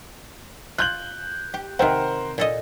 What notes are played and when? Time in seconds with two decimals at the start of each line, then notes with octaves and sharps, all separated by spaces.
0.78 F4 F#6 G6 F#7
1.54 G4
1.79 C3 D#3 C4 A#4 C5 F#5
2.38 A#2 A4 D#5